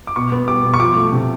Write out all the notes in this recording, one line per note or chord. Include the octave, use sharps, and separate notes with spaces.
D6
B2 C#6
B3
G3 D6
B2
C#6
F3 D6
A3
C3